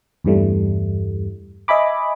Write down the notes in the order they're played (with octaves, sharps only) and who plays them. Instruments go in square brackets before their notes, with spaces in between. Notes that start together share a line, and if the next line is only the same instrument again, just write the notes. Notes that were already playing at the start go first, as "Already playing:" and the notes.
[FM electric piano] E2 G2 E3 G3 A3
D#5 E5 G#5 B5 D6